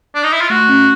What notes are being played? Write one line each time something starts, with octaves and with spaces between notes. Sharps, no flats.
D4
D#4
E4
F4
A3 F#4
C#4